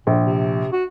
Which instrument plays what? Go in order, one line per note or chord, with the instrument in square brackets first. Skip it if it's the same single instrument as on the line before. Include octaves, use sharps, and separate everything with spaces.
[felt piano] A#1 [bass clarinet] A#2
[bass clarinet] C3
F#4